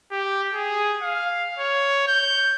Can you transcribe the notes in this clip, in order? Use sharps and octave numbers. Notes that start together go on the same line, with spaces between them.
G4
G#4
F5
C#5
G6